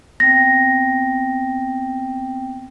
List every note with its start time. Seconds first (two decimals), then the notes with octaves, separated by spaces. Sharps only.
0.20 B3 C4 G5 A#6